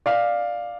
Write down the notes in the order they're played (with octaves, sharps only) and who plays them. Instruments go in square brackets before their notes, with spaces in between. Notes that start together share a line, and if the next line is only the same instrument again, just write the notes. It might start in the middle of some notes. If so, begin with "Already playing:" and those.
[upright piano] D5 F5